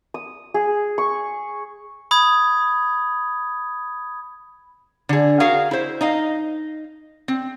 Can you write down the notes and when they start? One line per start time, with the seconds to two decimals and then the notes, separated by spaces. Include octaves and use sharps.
0.14 D#6
0.54 G#4
0.98 C#6
2.11 B5 D#6 G#6
5.09 D3 G#4
5.40 F#4 G#4 A#4 F5
5.71 E4 C5
6.01 D#4 D#5 F5
7.28 C4